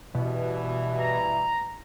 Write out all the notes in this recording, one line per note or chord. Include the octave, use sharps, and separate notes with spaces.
G2 B2 E3
A#5